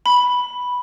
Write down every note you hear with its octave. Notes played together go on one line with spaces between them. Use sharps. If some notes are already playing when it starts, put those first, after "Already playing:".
B5